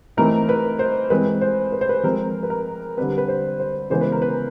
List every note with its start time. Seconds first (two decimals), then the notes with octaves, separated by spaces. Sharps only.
0.17 E3 A3 C4 D#4 A#4
0.49 B4
0.79 C5
1.10 E3 G#3 C4 B4
1.41 C5
1.72 B4
1.81 C5
1.89 B4
2.03 F3 G#3 C4 A#4
2.43 B4
2.50 A#4
2.97 D3 G3 C4 B4
3.18 B4
3.28 C5
3.60 C5
3.90 C#3 E3 G#3 B3 C5
4.01 B4
4.12 A#4
4.22 B4